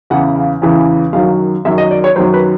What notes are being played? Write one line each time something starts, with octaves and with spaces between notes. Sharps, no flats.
E2 C#3 E3 F#5
F5
E2 C#3 E3
F#2 D#3 F#3 F5
F#2 D#3 F#3 E5
D#5
D5
C#5
F#2 D#3 F#3 C5
B4